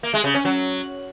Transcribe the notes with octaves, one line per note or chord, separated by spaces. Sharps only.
A#3
G#3
C#3
C#4
F#3